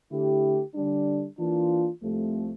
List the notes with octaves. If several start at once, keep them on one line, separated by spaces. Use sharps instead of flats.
D3 A3 E4 G4
D3 G3 D4
E3 A#3 D4 F4
C2 C3 F3 A3